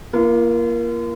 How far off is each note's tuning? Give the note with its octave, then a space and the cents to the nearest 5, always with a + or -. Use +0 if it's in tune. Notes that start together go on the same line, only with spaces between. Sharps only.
A#3 +15 F4 -40